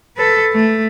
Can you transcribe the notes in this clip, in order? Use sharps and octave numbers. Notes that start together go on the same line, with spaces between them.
A4 B4
A3